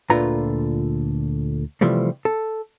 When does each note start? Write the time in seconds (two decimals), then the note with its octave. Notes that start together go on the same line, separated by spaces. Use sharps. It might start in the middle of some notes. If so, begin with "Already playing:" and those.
0.10 D2 A#2 D3 F4 B4 A#5
1.81 C3 E3 F3 G3 A3
2.25 A4